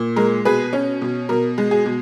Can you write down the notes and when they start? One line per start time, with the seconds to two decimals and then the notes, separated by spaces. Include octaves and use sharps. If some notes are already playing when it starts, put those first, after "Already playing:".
Already playing: A#2
0.16 G#3 A#4
0.45 B2 G#4 B4
0.73 C#4
1.02 B2
1.29 B2 A#4
1.58 G#3
1.71 G#4
1.86 B2